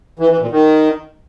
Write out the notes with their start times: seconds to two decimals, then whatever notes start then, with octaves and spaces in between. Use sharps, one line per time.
0.19 E3
0.30 E3
0.40 A#2
0.51 D#3